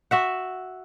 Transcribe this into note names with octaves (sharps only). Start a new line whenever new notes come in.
F#4 E5 F#5